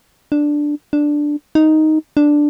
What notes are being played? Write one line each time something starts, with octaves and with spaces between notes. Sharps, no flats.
D4
D4
D#4
D4